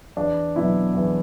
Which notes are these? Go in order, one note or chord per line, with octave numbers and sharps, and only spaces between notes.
E2 D4
B2 F#3 E4
E2